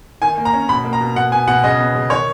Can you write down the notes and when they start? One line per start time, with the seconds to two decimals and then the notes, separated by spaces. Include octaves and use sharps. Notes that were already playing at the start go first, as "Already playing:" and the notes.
0.22 D#3 G#5
0.38 A#3
0.45 A#5
0.53 C#4
0.69 B2 B5
0.84 A#3
0.93 A#5
1.01 B2
1.16 B2 F#5
1.32 B3 G#5
1.47 B2 F#5
1.64 C#3 D#5
1.79 B3
1.95 C#3
2.10 D#3 C#5